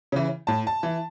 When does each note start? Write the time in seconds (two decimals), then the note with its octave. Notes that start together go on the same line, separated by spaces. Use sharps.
0.12 C#3 E3
0.47 A2 A5
0.67 A5
0.83 E3